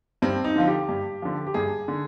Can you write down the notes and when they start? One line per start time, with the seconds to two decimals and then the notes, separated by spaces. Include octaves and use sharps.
0.22 G2 C4
0.44 D#4
0.56 D3 F3 F4
0.67 G4
0.89 G2
1.22 D3 F3
1.47 G4
1.54 G2 G#4
1.88 D3